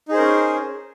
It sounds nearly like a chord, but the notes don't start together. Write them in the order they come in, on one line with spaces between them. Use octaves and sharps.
D#4 G#4 C5 A#4 C#4